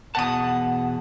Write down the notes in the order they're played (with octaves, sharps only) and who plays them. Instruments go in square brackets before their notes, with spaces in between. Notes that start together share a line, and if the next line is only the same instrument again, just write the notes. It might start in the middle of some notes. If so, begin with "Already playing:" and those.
[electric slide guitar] E2 B2 A5 [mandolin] F#5 D#6